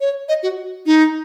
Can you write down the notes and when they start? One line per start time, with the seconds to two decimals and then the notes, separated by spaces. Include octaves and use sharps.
0.01 C#5
0.28 D#5
0.43 F#4
0.86 D#4